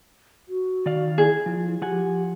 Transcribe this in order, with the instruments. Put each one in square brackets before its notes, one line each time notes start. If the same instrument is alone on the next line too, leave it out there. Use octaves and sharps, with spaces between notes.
[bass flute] F#4
[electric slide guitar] D#3 D5 F5
[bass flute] E4 [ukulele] G#4
[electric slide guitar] F3
[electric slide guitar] F3 F#5 G#5 [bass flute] G4